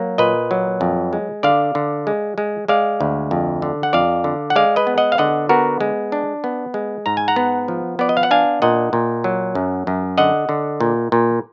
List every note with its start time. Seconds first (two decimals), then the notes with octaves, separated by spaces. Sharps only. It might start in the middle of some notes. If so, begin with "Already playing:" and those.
Already playing: F#3 A#3
0.18 A#2 B4 D#5
0.51 F#3
0.81 F2
1.13 G#3
1.43 D3 D5 F5
1.75 D3
2.07 G#3
2.38 G#3
2.68 G#3 D5 F5
3.01 D2
3.31 F2
3.62 D3
3.83 F#5
3.93 F2 D5 F5
4.24 D3
4.50 F#5
4.56 G#3 D5 F5
4.76 B4 D#5
4.87 B3
4.98 D#5 F#5
5.12 F5
5.18 D3 D#5 F#5
5.49 B3 F#4 A#4
5.81 G#3
6.12 D4
6.44 B3
6.74 G#3
7.06 G#2 A#5
7.17 G#5
7.28 F#5 A#5
7.36 B3
7.68 F3
7.99 B3 D5
8.09 D#5
8.17 F5
8.23 F#5
8.31 D4 F5 G#5
8.62 A#2 D#5 F#5
8.93 A#2
9.24 F#3
9.55 F#2
9.87 F#2
10.18 D3 D#5 F#5
10.49 D3
10.80 A#2
11.12 A#2